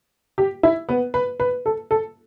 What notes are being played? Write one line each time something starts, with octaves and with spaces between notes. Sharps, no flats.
G4
E4
B3
B4
B4
A4
A4